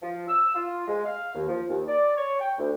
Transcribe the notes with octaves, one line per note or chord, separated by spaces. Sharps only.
F3
E6
F4
G#3
F5
D#2
F3
D#2
D5
C#5
G5
D2